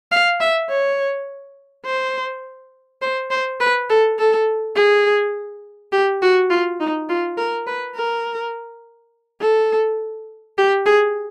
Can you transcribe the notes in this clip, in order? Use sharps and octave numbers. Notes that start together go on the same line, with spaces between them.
F5
E5
C#5
C5
C5
C5
B4
A4
A4
G#4
G4
F#4
F4
D#4
F4
A#4
B4
A#4
A4
G4
G#4